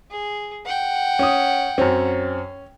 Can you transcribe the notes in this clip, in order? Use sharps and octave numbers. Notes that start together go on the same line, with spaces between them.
G#4
F#5 G5
C#4 D#6
F#2 C4 C#4